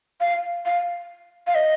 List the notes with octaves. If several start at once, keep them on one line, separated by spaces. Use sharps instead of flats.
F5
F5
F5
D#5